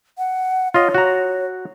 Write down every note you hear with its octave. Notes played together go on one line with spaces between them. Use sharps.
F#5
F4 C#5 D#5
F#4 A#5